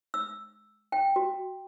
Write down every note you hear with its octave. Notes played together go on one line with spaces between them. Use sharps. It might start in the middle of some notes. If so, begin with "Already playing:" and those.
E6
G5
F#4